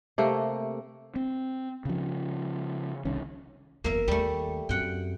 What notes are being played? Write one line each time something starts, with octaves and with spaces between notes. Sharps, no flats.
C3 A3 A#3
C4
C#3 F3
C2 D#3 C#4
F#1 E2 A#3 E5
D#2 G3 A3
F#2 C4 F#5 G5